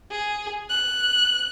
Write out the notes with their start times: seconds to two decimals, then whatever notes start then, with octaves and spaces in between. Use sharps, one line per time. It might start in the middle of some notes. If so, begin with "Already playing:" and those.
0.11 G#4
0.70 F#6